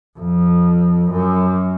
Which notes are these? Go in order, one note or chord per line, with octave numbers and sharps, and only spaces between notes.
F2
F#2